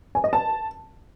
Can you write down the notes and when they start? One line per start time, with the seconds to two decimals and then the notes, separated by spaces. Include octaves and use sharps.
0.15 G#5
0.24 D#5
0.33 A5